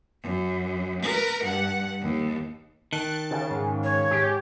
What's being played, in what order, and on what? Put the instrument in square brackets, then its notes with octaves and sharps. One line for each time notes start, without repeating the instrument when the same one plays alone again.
[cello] F#2
A#4 B4
G2 F#5
D#2
[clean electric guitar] D#3 [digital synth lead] A5 [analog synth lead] F#6
[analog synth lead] C#3
[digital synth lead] G#2
[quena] C#5
[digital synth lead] G#2 [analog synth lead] G4